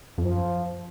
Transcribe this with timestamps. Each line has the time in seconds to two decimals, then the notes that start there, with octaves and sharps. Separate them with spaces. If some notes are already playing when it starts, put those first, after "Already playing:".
0.18 F2
0.23 F#2 F3